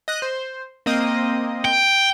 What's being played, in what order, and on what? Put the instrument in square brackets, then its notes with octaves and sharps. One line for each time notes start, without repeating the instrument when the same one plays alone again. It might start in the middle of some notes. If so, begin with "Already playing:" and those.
[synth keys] D#5 F#6
C5
A#3 C4 D#5
[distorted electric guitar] G5